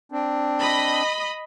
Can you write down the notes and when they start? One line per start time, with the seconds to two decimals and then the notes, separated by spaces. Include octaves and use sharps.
0.12 C4 D4
0.61 D#5 B5